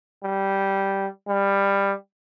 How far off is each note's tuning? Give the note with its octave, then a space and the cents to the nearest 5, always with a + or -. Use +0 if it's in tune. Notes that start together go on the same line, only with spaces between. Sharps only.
G3 -5
G3 +15